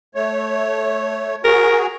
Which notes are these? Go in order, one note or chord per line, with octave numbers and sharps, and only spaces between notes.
A3 C#5
F#4 G#4 A#4